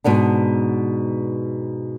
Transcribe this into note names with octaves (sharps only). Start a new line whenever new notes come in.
G#2 B2 B3 D4